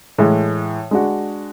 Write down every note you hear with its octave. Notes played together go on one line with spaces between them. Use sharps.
A2 E3 G#3
G#3 D4 F#4